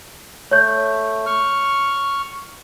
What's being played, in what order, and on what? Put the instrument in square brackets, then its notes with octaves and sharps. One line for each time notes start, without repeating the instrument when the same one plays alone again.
[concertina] A3 [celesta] C#5 G6
[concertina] C#6 F6